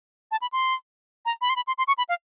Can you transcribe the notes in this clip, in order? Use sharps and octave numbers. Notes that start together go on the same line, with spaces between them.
A5
B5
C6
A#5
B5
C6
B5
C6
C6
C#6
B5
F5